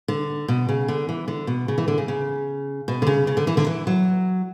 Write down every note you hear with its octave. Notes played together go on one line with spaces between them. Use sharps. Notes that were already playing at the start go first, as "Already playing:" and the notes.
D3
B2
C#3
D3
E3
D3
B2
C#3
E3
D3
C#3
C#3
B2
D3
C#3
C#3
D3
E3
D3
E3
F#3